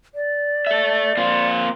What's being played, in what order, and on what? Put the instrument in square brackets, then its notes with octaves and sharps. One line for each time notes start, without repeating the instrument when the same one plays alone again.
[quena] D5
[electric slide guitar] A4 E5
A#3 C4 F4